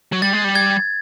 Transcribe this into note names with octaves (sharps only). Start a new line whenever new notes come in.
F#3
G3 A6
G#3
G3
G#6